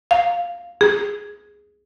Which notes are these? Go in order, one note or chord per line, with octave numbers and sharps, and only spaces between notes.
F5
G#4